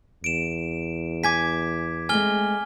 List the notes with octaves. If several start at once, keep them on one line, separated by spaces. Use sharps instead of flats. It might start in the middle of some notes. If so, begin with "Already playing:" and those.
E2 D7 E7
G#5 D6 G#6 B6
G#3 A3 C4 G#5 F6 G7